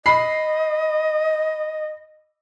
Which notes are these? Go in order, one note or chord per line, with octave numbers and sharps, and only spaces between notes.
D#5 B5 C7